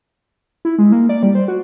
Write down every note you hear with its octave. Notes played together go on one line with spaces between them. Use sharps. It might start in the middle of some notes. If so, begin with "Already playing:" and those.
E4
G#3
A#3
D5
G3
C5
F#4